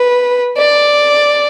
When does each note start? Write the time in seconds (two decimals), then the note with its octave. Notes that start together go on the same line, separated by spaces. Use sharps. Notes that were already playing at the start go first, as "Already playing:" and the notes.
Already playing: B4
0.58 D5